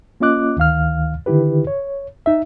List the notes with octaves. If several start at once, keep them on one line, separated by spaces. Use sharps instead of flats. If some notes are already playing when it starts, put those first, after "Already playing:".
A#3 C#4 F4 D#5 D6 F#6
D2 D#3 F5 F6
D3 D#3 E4 G4 B4
C#5
D#4 E5